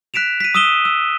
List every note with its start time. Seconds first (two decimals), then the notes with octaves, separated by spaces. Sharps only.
0.14 F#6 B6 D7 E7 F7
0.40 B6 D#7
0.55 D#6 E6 D#7 E7 G7
0.85 E6